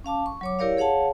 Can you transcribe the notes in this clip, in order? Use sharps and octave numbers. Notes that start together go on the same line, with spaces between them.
C#4 F5 A5 D6
C#6
F#3 C#5 D6
E4 G4 A#4 C#5 D5 F5
G#4 C#5 F5 F#5 A5